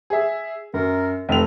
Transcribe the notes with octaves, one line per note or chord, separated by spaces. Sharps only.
G#4 E5
F#2 A#4
F1 C4 F7